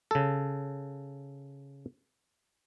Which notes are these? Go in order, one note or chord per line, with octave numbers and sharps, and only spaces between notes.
C#3 A4